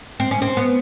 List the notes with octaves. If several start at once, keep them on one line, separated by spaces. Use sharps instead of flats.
C4
C#4
C4
B3